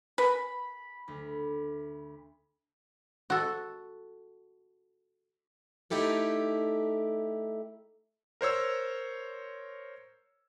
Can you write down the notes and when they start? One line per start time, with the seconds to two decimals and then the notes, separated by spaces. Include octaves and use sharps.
0.18 A#4 B4 B5
1.08 D2
3.30 F#4 A4
5.90 A3 D#4 E4 G4 A4 A#4
8.41 A#4 C5 C#5 E6